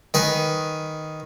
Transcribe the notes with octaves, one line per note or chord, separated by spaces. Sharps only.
D#3 B4 G#5